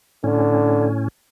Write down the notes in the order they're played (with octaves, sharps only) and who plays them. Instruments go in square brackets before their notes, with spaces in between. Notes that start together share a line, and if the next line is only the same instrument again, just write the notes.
[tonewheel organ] A2 C#4 [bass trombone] D3